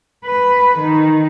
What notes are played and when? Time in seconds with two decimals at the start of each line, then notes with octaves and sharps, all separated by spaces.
0.25 B4
0.78 D#3